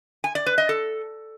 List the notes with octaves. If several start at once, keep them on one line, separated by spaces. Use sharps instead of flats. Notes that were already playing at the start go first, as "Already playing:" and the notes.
G#5
D5
B4
D#5
A4